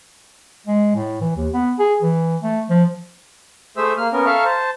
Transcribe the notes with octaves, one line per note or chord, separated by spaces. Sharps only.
G#3
A2
E3
D#2
B3
G#4
E3
A3
F3
A3 G#4 C5 E5 E6
A#3 F6
B3 C#4 A#4
A4 E5 F5 A#5 C#6 F6
C5 A5